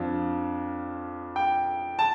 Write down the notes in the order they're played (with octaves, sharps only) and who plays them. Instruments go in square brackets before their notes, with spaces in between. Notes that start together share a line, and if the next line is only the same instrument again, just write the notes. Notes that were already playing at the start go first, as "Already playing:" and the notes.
Already playing: [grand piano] F2 F3 D4
G5
A5